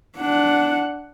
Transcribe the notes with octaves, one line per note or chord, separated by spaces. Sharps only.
D4 F#5